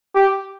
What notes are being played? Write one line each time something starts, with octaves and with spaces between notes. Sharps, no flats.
G4